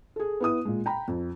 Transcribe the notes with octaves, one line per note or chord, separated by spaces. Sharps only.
G#4 A4
B3 E4 D#6
A#2 G#3
G5 A#5 B5
F2